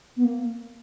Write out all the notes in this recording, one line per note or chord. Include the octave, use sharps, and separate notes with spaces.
B3
A#3